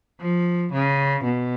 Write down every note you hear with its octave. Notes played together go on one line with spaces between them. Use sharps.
F3
C#3
B2